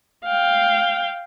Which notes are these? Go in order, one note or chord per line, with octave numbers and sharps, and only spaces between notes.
F5 G5